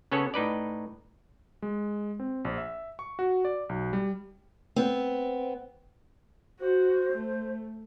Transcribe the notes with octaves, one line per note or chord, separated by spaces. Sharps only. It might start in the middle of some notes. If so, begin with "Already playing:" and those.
C#3 B3 C#4 A4 C#5
A2 D#4 B4 D5
G#3
C4
A#1
E5
C#6
F#4
D5
B1
G3
B3 C4
F#4 C5
A3